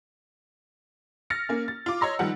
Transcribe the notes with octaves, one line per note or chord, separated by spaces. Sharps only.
F6 A6 A#6 C#7
A#3 C#4
A6
F4 D6
C#5 D#5 A#5 C6 E6 A#6
D#3 F3 G3 F#5